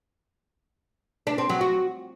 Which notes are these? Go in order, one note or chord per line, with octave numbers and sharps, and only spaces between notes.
D4
C4
F#3
F#4